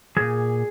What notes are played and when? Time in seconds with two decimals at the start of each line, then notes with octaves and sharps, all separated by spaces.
0.17 A#2 F3 G#4